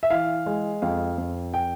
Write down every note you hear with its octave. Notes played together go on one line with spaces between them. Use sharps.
E5
E3 F5
G#3
F2 F5
F2
G5